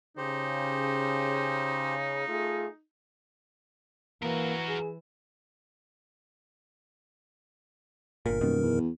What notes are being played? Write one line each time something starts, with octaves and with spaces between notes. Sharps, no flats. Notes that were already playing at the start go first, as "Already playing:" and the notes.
C#3 D#4 G4 C5
A3 F4 G#4
E3 A#3 F#4 A#4
G#4
G1 A#2 A#4
D#1 F#2 B2 D#3
E2